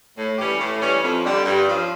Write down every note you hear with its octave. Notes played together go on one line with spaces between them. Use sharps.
A2
E3 G3 C#4 G4
A2
E3 G3 C#4
F2
D3 G3
G2
F3 C#4